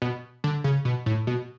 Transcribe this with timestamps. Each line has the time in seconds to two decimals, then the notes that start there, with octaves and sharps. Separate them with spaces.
0.02 B2
0.44 D3
0.64 C#3
0.85 B2
1.06 A2
1.27 B2